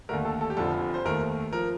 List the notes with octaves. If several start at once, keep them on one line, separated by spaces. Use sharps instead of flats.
D#2 D3 A3 A#4
A4
A4
G4
F1 F2 D3 F3 A4
C5
D#2 D#3 A3 A#4
F3 A#4